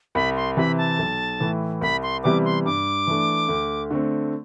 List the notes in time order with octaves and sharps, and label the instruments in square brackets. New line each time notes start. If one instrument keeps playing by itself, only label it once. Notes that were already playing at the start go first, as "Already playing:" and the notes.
[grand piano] C2 [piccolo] B5
[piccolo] C6
[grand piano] C3 E3 [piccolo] B5
[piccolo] A5
[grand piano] B1
A2 E3
[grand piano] C2 [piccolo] B5
[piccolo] C6
[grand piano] C3 E3 G3 B3 [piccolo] D6
[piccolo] C6
[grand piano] G2 [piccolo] D6
[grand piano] E3 A3 D4
D2
D3 A3 C4